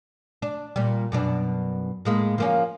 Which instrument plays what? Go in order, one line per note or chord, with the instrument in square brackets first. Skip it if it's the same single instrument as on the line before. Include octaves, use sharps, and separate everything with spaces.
[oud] D4
A#2 G3
F#2 B2 D4
A2 G#3 A#3
F3 A#3 C#4